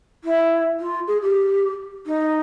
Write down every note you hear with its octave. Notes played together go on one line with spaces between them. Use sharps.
E4
F4
G#4
G4
D#4